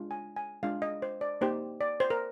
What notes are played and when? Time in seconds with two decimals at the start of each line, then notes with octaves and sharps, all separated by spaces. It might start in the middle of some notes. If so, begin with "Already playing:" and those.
Already playing: G#3 D4 F4
0.11 G#5
0.36 G#5
0.63 G#3 D4 F4 F5
0.82 D#5
1.02 C5
1.21 D5
1.41 A#3 D#4 G4 C5
1.81 D5
2.00 C5
2.10 A#4